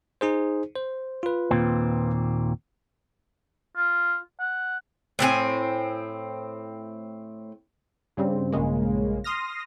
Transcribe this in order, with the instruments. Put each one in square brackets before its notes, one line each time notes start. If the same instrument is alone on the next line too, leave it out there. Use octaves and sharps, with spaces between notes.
[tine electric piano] D#4 G#4 C5
C5
F4 B4
[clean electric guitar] D#2 A#2 C4
[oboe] F4
F#5
[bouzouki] A2 C4 F#4 G#5
[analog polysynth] G2 C#3 G3 C4
A#1 G2 C#3 G#3 A#3
C6 D#6 F6 A#6